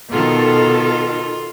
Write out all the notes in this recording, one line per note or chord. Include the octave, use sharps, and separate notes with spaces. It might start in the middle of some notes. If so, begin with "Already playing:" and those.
B2 D#3 F4 A4